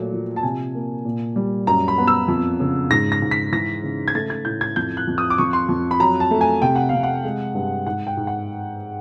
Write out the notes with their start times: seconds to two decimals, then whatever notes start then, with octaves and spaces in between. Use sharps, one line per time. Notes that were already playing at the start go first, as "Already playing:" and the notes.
Already playing: A#2 F#3 A3
0.12 F3
0.36 A5
0.43 C3 G#5
0.75 A#3
1.05 A#2
1.36 G3
1.67 F#2 A#5
1.88 B5
1.98 B3
2.07 E6
2.28 F2
2.60 C#3
2.91 G#2 A#6
3.12 A#6
3.22 G#2
3.31 B6
3.52 E3 A#6
3.83 C#3
4.08 G#6
4.15 A3 A6
4.30 G#6
4.45 A2 G6
4.61 G#6
4.76 F2 G6
4.97 F#6
5.07 F2
5.18 D#6
5.30 D6
5.38 F2 C#6
5.53 C6
5.69 F2
5.91 B5
6.00 F#3 A#5
6.20 A5
6.31 A3
6.41 G#5
6.62 C3 G5
6.76 F#5
6.89 C3 F5
7.03 F#5
7.24 G#3
7.54 G2
7.87 G#2 F#5
8.07 G5
8.17 G#2
8.27 F#5